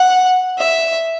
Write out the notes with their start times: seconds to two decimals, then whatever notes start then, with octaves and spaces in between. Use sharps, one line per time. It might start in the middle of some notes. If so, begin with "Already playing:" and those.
Already playing: F#5
0.58 E5